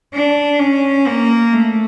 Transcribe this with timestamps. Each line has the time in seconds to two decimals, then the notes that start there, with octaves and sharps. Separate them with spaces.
0.14 D4
0.60 C#4
1.07 A#3
1.53 A3